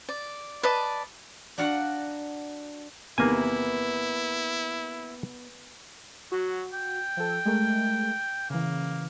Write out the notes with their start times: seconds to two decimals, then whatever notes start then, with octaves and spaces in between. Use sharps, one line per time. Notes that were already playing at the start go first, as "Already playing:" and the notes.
0.09 D5
0.63 B4 D5 D#5 A5
1.58 D4 F#4 F5 F#5 A#5
3.18 E2 C3 D#3 A#3 B3 E4 G#5
6.32 F#3 F#4
6.73 G5
7.17 F3 A4
7.45 G#3 A3 A#4
8.50 C#3 E3 A#3